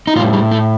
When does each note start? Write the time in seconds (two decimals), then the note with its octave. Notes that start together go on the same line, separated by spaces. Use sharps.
0.07 D#4
0.16 A2 F4
0.20 G3
0.33 G3
0.52 A3